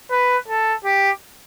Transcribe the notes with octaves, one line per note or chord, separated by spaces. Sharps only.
B4
A4
G4